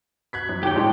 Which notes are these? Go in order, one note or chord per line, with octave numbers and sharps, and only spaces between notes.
F#6 G#6 B6
F#2
D#2 G4 C#5 G5
A2 G#3 D4